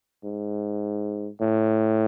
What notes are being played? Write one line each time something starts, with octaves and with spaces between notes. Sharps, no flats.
G#2
A2